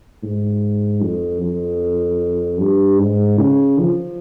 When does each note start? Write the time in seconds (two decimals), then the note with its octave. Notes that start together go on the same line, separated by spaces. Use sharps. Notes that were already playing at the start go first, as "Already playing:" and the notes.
0.23 G#2
1.01 F2
1.41 F2
2.59 G2
2.99 G#2
3.39 C#3
3.79 F3